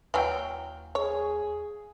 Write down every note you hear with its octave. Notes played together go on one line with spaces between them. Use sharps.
D#2 E3 F#3 F5 G5
G#4 C#5